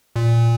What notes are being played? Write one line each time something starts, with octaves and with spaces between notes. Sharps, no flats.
A#2